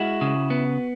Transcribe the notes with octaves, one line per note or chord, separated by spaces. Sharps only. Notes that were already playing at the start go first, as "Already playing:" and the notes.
Already playing: G#3 E4 F#4
C#3
B3